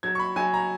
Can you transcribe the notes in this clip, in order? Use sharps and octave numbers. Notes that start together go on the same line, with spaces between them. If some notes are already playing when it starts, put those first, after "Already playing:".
F#3 G#6
C#6
B5
F#3 G#5
A#5